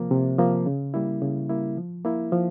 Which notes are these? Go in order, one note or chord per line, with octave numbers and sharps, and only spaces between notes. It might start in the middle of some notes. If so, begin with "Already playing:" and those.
Already playing: C3 F3 A#3
C3
F3 A#3
C#3
G3 A#3 E4
C#3
G3 A#3 E4
F3
A#3 E4
F3